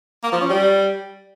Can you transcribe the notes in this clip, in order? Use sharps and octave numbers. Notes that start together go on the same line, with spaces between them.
A#3
F3
C#4
G3